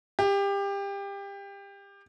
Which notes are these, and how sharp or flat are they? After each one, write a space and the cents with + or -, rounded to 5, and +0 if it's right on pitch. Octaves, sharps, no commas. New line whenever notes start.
G4 +25